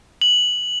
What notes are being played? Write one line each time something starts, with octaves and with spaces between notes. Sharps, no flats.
F#7